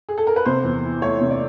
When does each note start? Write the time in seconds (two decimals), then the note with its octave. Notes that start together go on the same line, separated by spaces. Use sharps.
0.09 G#4
0.18 A4
0.27 A#4
0.36 B4
0.45 C3 C5
0.64 E2
0.84 E3
1.02 A3 C#5
1.21 C3
1.30 D5